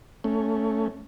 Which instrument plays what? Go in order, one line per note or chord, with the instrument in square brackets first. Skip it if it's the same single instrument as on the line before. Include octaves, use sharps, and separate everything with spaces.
[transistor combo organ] A3 C#4